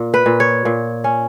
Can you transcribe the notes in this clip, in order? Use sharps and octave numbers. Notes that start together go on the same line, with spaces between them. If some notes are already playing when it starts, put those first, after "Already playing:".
Already playing: A#2
B4
A#2
C#5
A#2
C#4